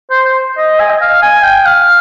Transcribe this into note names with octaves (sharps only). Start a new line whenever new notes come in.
C5
C5
D#5
G#5
D#5
F5
G#5
G5
F5